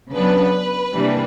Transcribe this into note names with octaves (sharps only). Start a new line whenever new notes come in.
C#3 F#3 B3 D4 B4
C3 E3 G3 A#3 D4